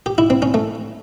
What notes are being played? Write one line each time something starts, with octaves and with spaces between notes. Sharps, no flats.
G4
E4
C4
C#4
A3